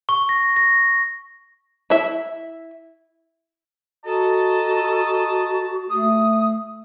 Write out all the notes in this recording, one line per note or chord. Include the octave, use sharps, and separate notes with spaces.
C#6
A#6
A#6
E4 E5
F#4 A4 D#5 A5 A#5
A3 D#6